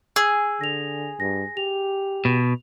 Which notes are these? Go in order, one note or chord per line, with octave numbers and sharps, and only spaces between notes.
G#4 E6
D3 A#6 F7
G2 A#6
G4 F7
B2